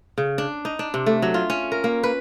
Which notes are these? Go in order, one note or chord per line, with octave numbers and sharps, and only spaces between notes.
C#3
D4
D#4
D4
C3
A3
F#3
F4
C#4
A#4
A#3
B4